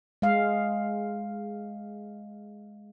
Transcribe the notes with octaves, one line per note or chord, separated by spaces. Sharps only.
G#3 F5